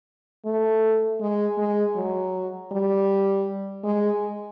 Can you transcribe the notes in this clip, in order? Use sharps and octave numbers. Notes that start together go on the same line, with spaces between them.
A3
G#3
G#3
F#3
G3
G#3